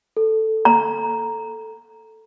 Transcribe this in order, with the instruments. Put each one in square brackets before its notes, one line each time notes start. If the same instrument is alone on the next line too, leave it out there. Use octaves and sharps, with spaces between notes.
[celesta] A4
[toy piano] A#5